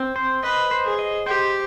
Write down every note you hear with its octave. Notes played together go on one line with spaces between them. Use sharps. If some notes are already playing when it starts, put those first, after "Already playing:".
Already playing: C4
C5
B4 D#5
C5
G#4
D#5
G4 C5